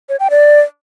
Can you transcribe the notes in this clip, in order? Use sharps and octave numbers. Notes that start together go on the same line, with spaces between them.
C#5
G5
D5